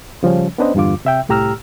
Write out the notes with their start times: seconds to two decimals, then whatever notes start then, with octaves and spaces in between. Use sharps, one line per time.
0.23 C#3 F3 G3 C#4
0.58 B3 C#4 D4 B4 C5 D#5
0.75 E2 G2 D3 F4 D6
1.05 C3 E5 G5
1.29 C2 A2 G4 A#5 E6 F6